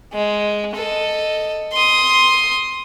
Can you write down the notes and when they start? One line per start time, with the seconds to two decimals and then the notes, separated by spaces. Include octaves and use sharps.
0.13 G#3
0.75 A4 D#5
1.73 C6 D#6